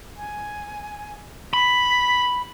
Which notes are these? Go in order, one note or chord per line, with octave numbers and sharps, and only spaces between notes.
G#5
B5 B6